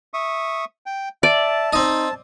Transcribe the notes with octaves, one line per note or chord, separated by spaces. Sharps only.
E5 C#6 D#6
G5
D5 E5 A5
C4 D#4 D#5